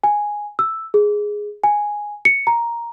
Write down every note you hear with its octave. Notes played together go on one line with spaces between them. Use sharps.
G#5
E6
G#4
G#5
C#7
A#5